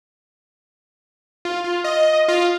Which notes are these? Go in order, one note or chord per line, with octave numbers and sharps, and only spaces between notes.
F4
F4
D#5
F4